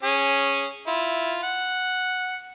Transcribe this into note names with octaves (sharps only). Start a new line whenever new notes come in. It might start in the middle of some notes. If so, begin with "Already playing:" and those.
C#4 G#4
E4 F4
F#5